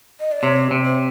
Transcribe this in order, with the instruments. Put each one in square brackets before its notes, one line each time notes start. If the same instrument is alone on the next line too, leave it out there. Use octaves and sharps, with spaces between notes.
[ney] D#5
D5
[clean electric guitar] C3 [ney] C#5
[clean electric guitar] C3
[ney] C5